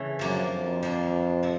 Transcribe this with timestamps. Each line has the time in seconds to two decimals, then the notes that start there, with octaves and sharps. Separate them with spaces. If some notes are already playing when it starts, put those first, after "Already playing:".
Already playing: C#3 E3 A3
0.19 F#2 F3 A#3 D4
0.52 F2
0.83 F3 A#3 D4
1.43 C3 F3